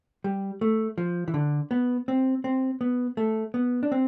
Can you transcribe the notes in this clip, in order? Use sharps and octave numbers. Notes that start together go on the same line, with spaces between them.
G3
A3
F3
E3
D3
B3
C4
C4
B3
A3
B3
D4
C4